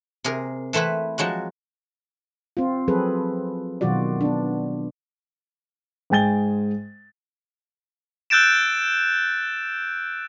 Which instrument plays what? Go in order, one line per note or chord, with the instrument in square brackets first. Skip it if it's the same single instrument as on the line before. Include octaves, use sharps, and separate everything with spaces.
[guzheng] C3 G#4 A#4
E3 A3 C4 E4 B4
F3 F#3 G#3 F#4
[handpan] C4 F4
F3 F#3 C4 G#4 A4 B4
B2 D#3 F#3 F4 F#4 D5
B3 D4
[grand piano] G#2 G#3 G5 G#5 A6 G7
[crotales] E6 F#6 G6 A6 D7 E7